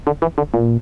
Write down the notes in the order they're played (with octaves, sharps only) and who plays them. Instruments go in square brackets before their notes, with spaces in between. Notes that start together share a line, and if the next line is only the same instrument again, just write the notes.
[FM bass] D3
E3
D3
A#2